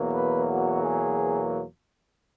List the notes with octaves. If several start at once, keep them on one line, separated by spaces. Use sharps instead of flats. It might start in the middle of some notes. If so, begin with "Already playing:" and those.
Already playing: E2 B2 F#3 A#3
B4
F#4
G#4